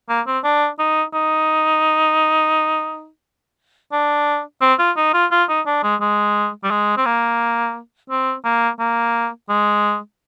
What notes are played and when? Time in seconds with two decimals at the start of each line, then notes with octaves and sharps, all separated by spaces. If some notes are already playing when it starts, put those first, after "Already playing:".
0.09 A#3
0.27 C4
0.44 D4
0.79 D#4
1.14 D#4
3.92 D4
4.62 C4
4.79 F4
4.97 D#4
5.14 F4
5.32 F4
5.49 D#4
5.66 D4
5.83 G#3
6.01 G#3
6.64 G3
6.71 G#3
6.97 C4
7.06 A#3
8.10 C4
8.45 A#3
8.79 A#3
9.49 G#3